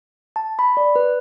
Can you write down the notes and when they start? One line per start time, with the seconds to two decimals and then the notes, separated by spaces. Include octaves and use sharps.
0.36 A5
0.59 B5
0.77 D5
0.96 B4